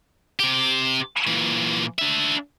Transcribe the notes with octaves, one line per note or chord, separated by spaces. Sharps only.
C3 G4
A#2 E3
D4 E5